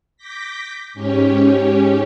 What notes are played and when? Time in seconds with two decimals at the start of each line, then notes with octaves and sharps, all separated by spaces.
0.17 D6 G6 A#6 B6
0.94 G#2 C#4 G4 C#5